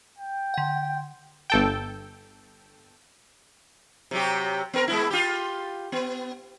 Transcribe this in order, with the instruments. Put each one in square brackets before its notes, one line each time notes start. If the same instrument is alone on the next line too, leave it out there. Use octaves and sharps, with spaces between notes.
[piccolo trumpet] G5
[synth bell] D3 F#5
[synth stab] G1 A4 G5
[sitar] C3 F#3 G4
B3 A#4
G#3 B3 E4
F4 G4
B3